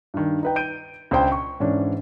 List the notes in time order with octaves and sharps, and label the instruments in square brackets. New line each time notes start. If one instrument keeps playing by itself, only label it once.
[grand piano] G2 D#3
D#4 B4 G5
G6 D7 D#7
C#2 D4 C5 G5
C#6
G#2 E3 C#4 D4